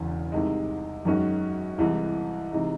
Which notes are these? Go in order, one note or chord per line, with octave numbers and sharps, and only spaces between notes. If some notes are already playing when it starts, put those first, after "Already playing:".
Already playing: E1 E2 C#3 E3
C2 C3 D#3 G#3
F#2 D#3 G#3 C#4 F#4
C2 C3 E3 G#3
C3 E3 G#3 D#4